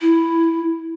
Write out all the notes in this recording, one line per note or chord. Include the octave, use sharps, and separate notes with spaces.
E4